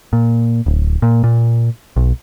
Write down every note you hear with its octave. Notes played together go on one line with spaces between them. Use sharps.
A#2
D1
A#2
A#2
B1